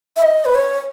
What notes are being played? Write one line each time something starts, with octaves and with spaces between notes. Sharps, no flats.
E5
D#5
B4
C#5